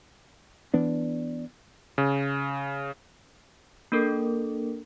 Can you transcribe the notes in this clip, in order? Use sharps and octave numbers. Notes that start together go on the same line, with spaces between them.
E3 B3 D4
C#3
A#3 D4 A4 A#4